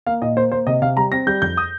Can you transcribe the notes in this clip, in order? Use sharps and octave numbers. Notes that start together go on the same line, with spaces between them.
A#3 F5
A#2 D#5
A#3 C5
A#3 C5
C3 D#5
C3 F5
G3 A#5
C4 A#6
G3 G6
F2 G6
D#6